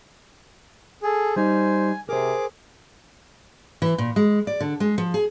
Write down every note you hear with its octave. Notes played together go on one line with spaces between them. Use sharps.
G#4 A4
G3 D#4 C5 G#5
C3 G#4 A#4 C5 D6
E3
A#2
G#3
D5
D3
G#3
F3
G#4